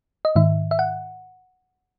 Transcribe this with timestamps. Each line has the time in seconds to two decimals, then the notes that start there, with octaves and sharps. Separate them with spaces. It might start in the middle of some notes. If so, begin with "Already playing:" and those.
0.25 D#5
0.36 G#2 D#3 E5
0.71 E5
0.79 F#5